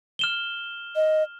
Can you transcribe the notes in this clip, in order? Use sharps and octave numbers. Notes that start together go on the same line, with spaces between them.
F6 E7 G7
D#5